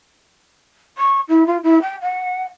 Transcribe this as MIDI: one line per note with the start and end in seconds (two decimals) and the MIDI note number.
0.98 1.20 85
1.29 1.46 64
1.47 1.58 65
1.63 1.81 64
1.82 1.96 79
2.02 2.42 78